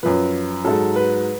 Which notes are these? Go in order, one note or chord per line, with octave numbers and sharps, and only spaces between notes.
F#2 F3 B4
G#2 F#3 A4
B4